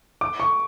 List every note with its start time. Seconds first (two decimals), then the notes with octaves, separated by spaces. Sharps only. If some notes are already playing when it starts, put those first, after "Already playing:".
0.21 D6
0.40 C#6